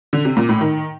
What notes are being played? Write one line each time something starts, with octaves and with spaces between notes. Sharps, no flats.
D3
C3
A#2
A2
D#3